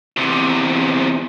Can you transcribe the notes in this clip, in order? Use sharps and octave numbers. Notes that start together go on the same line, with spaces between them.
E2 C3